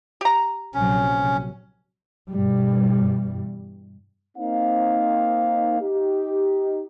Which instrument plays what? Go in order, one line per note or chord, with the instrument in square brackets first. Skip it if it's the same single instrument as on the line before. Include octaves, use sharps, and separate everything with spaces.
[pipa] G4 A#5
[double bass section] A#1 C3 F#3 [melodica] C#4
[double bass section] G2 B2 E3 G3
[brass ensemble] A#3 C4 D#4 F5
D#4 G4